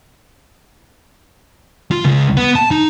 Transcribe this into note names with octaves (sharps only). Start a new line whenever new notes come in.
F4
C#2
B3
A5
D#4